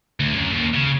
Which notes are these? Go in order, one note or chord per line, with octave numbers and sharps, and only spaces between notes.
D2
F#2
D#2
C#3